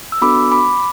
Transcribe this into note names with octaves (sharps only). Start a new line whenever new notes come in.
E6
B3 D4 F#4 A4 B5 D6
B5 D6